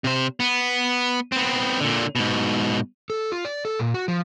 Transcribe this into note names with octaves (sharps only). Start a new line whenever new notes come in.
C3 C5
B3
B3 C4
A#2 D3
G#2 B2
A4
F4
D5
A4
A#2
F#4
F3